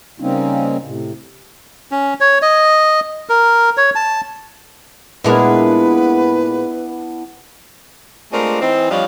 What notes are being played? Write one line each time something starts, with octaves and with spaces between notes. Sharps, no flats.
C#3 G3 A#3 C4 C#4 D#4
A2 C3
C#4
C#5
D#5
A#4
C#5
A5
A#2 G#3 B3 D4 E4 A#4 B4
G#3 A3 C4 D4 F4 A#4
E3 C4 D#4
F3 G3 D4 C#5 D#5 F5